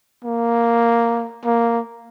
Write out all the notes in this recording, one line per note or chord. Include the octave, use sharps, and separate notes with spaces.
A#3
A#3